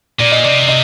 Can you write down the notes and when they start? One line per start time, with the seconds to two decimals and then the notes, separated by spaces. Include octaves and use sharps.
0.19 A#2 D5
0.32 D#5
0.44 C3 D5
0.69 D#5